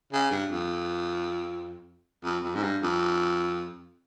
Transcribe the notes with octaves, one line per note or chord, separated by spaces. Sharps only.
C#3
G2
F2
F2
F2
G#2
G2
F2